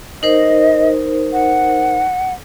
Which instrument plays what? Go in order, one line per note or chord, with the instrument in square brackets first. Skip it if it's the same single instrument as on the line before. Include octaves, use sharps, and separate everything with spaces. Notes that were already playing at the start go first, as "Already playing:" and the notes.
[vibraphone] D#4 A#4 C5 [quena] D#5
[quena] F#5